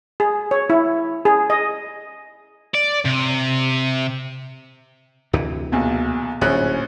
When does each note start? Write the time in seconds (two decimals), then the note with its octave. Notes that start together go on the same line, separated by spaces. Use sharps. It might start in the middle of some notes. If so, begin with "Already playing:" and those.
0.20 G#4
0.51 C#5
0.70 E4
1.25 G#4
1.50 D#5
2.75 D5
3.05 C3
5.33 D2 C3 E3
5.72 B1 E2 A#2
6.41 D1 A#1 C#4 F#6